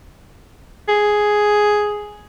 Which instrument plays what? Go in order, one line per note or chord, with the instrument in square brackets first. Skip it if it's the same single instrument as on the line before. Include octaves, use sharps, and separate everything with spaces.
[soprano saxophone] G#4